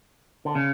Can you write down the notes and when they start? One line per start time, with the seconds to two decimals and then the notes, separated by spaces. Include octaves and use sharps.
0.45 D3
0.55 C#3